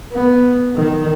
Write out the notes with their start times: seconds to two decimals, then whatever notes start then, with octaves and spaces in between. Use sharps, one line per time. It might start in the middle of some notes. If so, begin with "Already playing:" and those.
0.12 B3
0.76 D#3